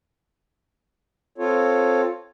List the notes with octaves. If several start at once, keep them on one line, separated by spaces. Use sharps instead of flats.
C4 F4 A4 C#5